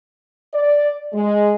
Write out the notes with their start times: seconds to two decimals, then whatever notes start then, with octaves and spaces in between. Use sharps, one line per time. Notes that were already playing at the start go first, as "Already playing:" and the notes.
0.53 D5
1.13 G#3